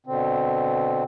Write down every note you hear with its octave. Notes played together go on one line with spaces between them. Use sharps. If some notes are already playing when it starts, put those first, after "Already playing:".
B2 D3 C4